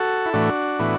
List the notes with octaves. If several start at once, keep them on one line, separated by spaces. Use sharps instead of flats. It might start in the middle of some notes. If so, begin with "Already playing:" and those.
Already playing: F#4 A4
E4
A2 E3 A3 D4 F#4
A2 E3 B3